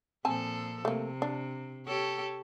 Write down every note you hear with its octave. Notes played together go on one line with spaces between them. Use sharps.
A#2 F3 C4 A4 G#5 A5
C3 A3 A#3
D4
G4 A4 C#5